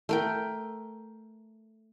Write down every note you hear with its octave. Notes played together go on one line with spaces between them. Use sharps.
A3 A#4 G5